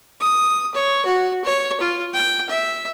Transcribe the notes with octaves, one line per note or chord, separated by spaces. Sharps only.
D#6
C#5
F#4
C#5
F4
G5
E5